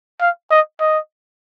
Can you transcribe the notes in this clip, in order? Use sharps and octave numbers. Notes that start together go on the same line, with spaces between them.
F5
D#5
D#5